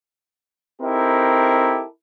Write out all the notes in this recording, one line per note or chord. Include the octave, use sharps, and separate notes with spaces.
C4 D#4 E4 G4 A4 A#4